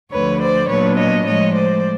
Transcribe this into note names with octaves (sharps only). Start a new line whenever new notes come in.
D2 D3 F3 B4 C#5
C5 D5
A#2 F#3 B3 D4 B4 C#5
C#5 D#5
A2 F3 G#3 C#5 D#5
C5 D5